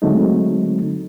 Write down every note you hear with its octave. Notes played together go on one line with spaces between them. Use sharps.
D3 F#3 G#3 A3 C4 D#4